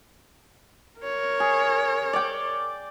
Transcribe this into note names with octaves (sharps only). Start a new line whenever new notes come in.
A#4 C#5
G#4
D5 G5